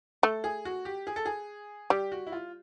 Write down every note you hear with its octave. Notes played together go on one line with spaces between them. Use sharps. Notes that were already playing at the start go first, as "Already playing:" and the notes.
A3 A4
G#4
F#4
G4
G#4
A4
G#4
G3 G4
F#4
E4
F4